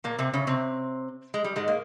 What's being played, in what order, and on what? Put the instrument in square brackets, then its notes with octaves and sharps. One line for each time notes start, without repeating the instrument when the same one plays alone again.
[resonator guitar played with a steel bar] A#2 A#3
C3 C4
C#3 C#4
C3 C4
G#3
G3
G#2 G#3
A#3